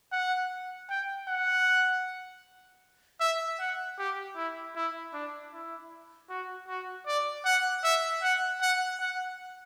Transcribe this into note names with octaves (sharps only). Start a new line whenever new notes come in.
F#5
G5
F#5
E5
F#5
G4
E4
E4
D4
E4
F#4
F#4
D5
F#5
E5
F#5
F#5
F#5